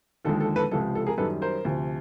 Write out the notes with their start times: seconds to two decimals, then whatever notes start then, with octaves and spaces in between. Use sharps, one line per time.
0.25 D#2 D3 F3 G#3 A4
0.40 A4
0.56 A4 B4
0.71 C#2 C3 F3 G#3 A4
0.95 A4
1.07 G#4 A#4
1.18 F#2 D#3 G3 A4 B4
1.42 A#4 C5
1.65 D2 C3 F3